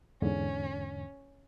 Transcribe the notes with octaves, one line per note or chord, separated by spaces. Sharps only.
E2 G#2 D3 C#4